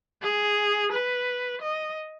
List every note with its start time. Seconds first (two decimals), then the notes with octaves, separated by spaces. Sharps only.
0.22 G#4
0.92 B4
1.62 D#5